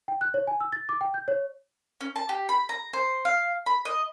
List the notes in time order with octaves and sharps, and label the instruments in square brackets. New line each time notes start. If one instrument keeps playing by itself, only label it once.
[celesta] G5
F#6
C#5
G#5
E6
A6
D6
G5
G6
C#5
[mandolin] C#4
A5
G4
B5
A#5
C5
F5
B5
D#5